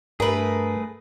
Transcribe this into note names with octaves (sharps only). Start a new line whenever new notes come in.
G2 A3 G#4 A#4 B4